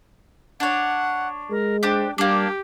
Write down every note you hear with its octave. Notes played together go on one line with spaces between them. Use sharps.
D4 C#5 F#5
G#3 A#4
D4 G4 C5
G3 A#3 D4 G4